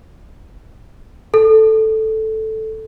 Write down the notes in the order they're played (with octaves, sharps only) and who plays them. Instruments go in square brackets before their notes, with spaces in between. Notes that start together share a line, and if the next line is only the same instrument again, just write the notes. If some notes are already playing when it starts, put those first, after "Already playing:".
[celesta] A4